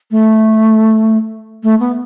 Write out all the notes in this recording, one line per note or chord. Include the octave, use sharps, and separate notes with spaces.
A3
A3
B3